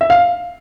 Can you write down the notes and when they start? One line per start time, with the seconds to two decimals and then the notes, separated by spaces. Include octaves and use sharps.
0.01 E5
0.10 F5